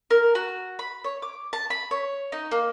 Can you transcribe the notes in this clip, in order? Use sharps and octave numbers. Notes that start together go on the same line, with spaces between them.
A#4
F#4
B5
C#5
D6
A5
B5
C#5
D#4
A#3